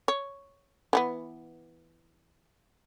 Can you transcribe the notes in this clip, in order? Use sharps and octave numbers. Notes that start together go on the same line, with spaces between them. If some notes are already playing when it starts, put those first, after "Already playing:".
C#5
E3 G3 B3